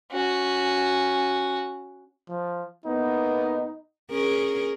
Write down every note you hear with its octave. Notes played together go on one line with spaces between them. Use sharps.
C#4 F#4
F3
A2 A#3 B3 D#4
C#4 G#4 A#4